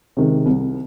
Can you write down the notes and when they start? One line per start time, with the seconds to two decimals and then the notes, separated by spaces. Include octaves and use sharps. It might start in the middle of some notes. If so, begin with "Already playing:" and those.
0.17 C3 D#3 G#3
0.46 C2